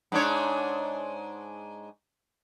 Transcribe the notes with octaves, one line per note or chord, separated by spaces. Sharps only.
G#2 D4 C#5